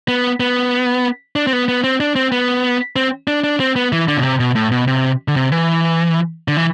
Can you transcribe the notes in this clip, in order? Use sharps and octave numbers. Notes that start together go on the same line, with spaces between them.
B3
B3
D4
C4
B3
B3
C4
D4
C4
B3
C4
D4
D4
C4
B3
E3
D3
B2
C3
B2
A2
B2
C3
D3
C3
E3
D3
E3